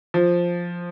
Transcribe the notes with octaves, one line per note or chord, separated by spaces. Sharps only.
F3